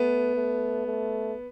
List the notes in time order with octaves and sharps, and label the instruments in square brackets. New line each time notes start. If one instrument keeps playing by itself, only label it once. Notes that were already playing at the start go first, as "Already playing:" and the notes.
Already playing: [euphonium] A3 [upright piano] B3
[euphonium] A3
A3